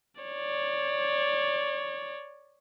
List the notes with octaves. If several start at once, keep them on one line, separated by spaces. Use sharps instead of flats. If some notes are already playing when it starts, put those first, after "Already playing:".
C#5 D5